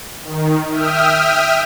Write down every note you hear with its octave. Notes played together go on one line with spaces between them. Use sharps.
D#3
E5 G5 D#6 F6